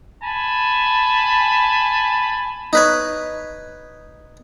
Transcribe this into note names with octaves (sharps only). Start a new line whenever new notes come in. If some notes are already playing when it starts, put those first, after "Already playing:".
G#5 A5 B5
D#4 B4 C#5